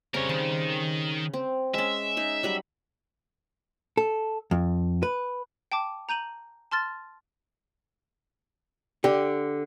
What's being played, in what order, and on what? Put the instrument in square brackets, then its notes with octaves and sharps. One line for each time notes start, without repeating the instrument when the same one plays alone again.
[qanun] C#3 G3 C4 [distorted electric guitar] A#4 C#5
[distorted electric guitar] D#3 [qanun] A5
[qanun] C4
[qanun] G#3 C#4 [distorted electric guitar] E5
[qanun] D#4 G#4
F#3 G3 B5
[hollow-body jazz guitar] A4
F2
B4
[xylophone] G5 A5 D6
A#5 G6 D#7 F#7
A5 C6 F6 A6
[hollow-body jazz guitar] D3 G4